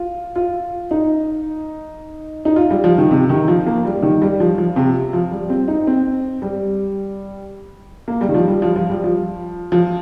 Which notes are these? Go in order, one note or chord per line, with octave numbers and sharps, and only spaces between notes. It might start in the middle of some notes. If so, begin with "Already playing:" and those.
Already playing: F4
F4
D#4
D#4
F4
G3
F3
D#3
C3
D#3
F3
A#3
G3
D#3
G3
F3
F3
C3
F3
G3
C4
D#4
C4
G3
A#3
G3
D#3
F3
G3
F3
F3
G3
F3
F3